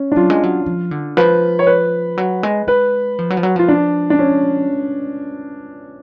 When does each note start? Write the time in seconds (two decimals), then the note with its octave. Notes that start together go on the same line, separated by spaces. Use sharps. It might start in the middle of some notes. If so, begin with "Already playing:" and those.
Already playing: C#4
0.12 D4
0.16 F#3 F4
0.30 G#3
0.43 F#3
0.66 F3
0.91 D3
1.17 F3 B4
1.59 C#5
1.67 B4
2.18 F#3
2.43 G#3
2.67 G#3 B4
3.19 F3
3.30 F#3
3.37 F3
3.43 F#3
3.56 F3 F4
3.68 D4
4.10 D4
4.19 C#4